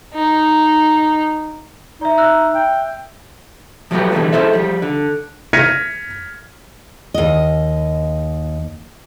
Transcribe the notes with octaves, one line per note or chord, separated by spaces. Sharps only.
D#4
D#4 D5 E5
E5 E6 F#6
G5
F3 F#3 A3 F#4 G4 B4
B2 D3 E3 G3 A3
A3 C#4 E4 A4 C5 E5
F3 G3
D3
F6 G#6 A#6 B6 C#7 D#7
D#2 D#5